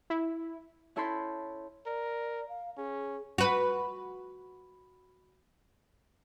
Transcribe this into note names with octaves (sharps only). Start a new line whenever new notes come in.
E4
C#4 E4 A4 B5 C6 G6
A#4 D5
F5
C#4 G#4
F#4 B4